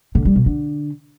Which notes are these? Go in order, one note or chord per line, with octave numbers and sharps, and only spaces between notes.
D3
G3
B2
D3